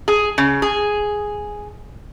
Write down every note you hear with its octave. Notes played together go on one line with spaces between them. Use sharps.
G#4
C#3
G#4